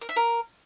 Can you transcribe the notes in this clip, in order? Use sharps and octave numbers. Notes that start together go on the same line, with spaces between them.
A#4
E5
A#4